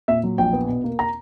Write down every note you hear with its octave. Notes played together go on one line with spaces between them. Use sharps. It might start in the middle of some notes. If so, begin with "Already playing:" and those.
A#2 E5
F#3
A#1 G5
B3
B2
A#3
A#5